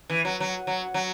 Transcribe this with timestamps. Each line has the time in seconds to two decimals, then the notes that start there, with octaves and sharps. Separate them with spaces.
0.10 E3
0.25 F#3
0.40 F#3
0.67 F#3
0.94 F#3